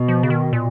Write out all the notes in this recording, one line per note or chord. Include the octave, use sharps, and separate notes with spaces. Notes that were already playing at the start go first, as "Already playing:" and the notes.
Already playing: B2
F3
C#3
D#3
A#2